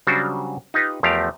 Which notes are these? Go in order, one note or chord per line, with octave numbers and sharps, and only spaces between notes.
C#3 F#3 G3 D4 F#4 C5
D#4 F4 G4 B4
E2 F3 A3 G4 A#4 F5